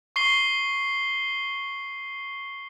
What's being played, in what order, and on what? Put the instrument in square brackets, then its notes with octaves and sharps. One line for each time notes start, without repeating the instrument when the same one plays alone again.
[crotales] C#6 C7 G7